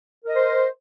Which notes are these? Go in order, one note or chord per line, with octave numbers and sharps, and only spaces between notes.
A#4 C5 D#5